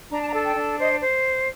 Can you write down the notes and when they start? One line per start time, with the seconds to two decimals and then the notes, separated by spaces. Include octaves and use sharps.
0.11 D4 A#5
0.21 A5
0.29 A#5
0.34 A4
0.45 G5
0.56 D4
0.78 C5 D#5
1.01 C5